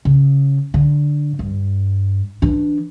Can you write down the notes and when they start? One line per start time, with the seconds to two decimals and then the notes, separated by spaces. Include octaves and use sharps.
0.05 C#3
0.74 D3
1.39 G2
2.42 E3 D4